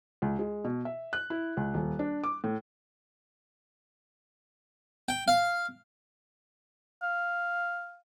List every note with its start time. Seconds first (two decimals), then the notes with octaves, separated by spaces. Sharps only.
0.22 C#2
0.39 G#3
0.64 B2
0.85 E5
1.13 F#6
1.30 E4
1.57 C#2
1.74 D#1
1.99 D4
2.24 D6
2.44 A2
5.09 G5
5.28 F5
7.02 F5